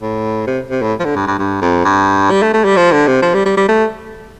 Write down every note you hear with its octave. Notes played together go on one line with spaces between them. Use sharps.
A2
C3
C3
A2
F3
D3
G2
G2
G2
F2
G2
G3
A3
A3
G3
F3
D3
C3
F3
G3
G3
G3
A3